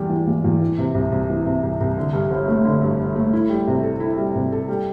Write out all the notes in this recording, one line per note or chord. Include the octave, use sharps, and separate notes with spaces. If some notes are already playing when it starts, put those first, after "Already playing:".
Already playing: E2 G3
E3
E2
E2
E3
C3
C2
C2
E3
C3
C2
C2
D3
G2
G1
A3
D3
G2
G1
A3
E4
G3
C3
A4
E4
G3
C3
A4
G3